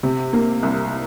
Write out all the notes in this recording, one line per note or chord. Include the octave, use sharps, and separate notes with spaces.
C3
A#3
C2